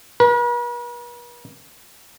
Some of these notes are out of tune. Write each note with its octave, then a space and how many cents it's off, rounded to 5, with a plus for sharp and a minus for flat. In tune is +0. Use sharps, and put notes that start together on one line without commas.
B4 -45